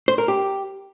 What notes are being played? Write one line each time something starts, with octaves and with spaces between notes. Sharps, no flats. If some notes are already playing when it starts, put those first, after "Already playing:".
C5
A#4
G4